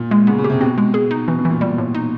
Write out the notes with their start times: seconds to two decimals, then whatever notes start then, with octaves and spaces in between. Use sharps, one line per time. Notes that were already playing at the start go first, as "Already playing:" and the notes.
Already playing: A#2
0.11 G#3
0.27 C#3 B3
0.38 C#3
0.44 G4
0.50 C3
0.61 B2 C4
0.78 G#3
0.94 G#4
1.11 D#4
1.28 B2 E3
1.39 B2
1.45 E3
1.50 A#2
1.61 G3
1.78 A2
1.95 D#4